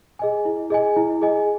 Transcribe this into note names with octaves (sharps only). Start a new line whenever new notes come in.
G#4 D#5 G#5
E4
G#4 D#5 G#5
E4
G#4 D#5 G#5